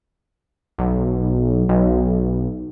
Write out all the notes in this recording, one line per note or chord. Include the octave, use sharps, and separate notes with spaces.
B1
B1